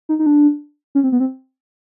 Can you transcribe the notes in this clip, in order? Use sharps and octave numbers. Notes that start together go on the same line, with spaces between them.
D#4
D#4
D4
C#4
C4
B3
C4